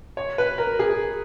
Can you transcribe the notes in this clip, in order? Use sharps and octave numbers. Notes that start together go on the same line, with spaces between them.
C#5
B4
A#4
G#4